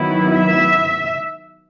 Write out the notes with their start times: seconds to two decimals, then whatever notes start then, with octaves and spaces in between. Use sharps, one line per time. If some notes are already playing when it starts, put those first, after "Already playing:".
Already playing: D#3 F#3 B3 E4
0.34 E5